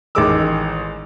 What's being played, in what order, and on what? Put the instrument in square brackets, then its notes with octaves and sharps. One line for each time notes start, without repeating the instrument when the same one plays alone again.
[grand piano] A1 D#3 G#3 D6 E6